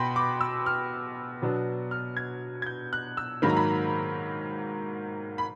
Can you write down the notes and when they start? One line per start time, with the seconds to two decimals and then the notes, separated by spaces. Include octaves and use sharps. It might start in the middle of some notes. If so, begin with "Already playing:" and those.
Already playing: B2 B3 G5 B5 C6
0.16 D6
0.41 E6
0.66 F6
1.42 B2 F#3 B3 D4
1.91 F6
2.17 G#6
2.62 G#6
2.66 G6
2.93 F#6
3.17 E6
3.42 G#2 D#3 F#3 A#3 B5
3.49 A#5
3.57 B5
5.38 B5